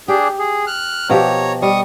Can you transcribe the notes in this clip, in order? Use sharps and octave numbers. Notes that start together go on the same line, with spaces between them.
D4 G4 G#4
G#4
F6 F#6
B2 F3 G4 C#5 A#5
G3 D#5 F5 C#6 D#6